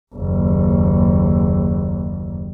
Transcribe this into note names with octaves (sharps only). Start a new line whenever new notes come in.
F#1 D#2